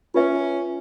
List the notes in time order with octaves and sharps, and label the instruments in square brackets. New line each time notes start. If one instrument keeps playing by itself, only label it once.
[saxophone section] C#4 [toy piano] F4 B4 E5